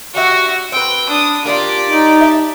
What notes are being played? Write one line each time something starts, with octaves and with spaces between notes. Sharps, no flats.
D4 F#4 G4 E5
C4 B4 G5
D4 D#6
A#3 D4 F4 G4 D5
D#4
E5 A5